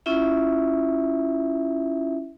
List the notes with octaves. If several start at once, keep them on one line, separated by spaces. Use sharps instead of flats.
C#4 E4 F4 E5